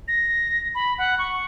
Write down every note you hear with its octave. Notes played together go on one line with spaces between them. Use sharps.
A#6
B5
F#5
C#6